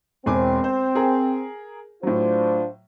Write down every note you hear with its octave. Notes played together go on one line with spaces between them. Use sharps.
E1 C4 G#5 D6
C5
G#4 A#4 G#5
A2 F#3 D4 F4 C5